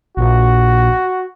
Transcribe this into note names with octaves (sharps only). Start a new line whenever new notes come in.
A#1 F#4